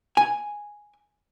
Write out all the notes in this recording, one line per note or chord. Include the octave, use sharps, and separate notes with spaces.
G#5